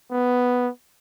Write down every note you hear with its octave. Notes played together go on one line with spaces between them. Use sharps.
B3